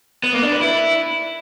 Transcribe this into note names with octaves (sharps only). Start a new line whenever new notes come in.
B3
A#3
D4
B4
E4